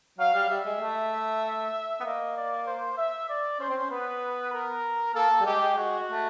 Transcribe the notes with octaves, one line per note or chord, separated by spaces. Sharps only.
F#3 F5
G3
G3 E5
G#3
A3
B3
A#3 D#5
D5
C5
E5
D5
C#4 C5
C4
C#4
B3 B4
A#4
A#3 A4
A#3
G3
G#3 G4
G#3
G#3 F#4
A3